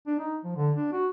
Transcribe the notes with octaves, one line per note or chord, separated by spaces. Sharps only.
D4
D#4
F3
D3
D4
F#4